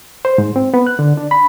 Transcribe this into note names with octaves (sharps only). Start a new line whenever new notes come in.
C5
G#2
C4
B3
F#6
D3
D4
B5